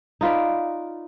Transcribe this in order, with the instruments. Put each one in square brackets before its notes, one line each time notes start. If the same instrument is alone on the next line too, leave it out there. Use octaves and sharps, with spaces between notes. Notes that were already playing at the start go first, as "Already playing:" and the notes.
[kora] D#4 F4 B4 D5